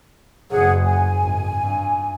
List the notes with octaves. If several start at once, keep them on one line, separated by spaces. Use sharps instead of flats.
F#1 G#4 F#5
G#5
G#1
G2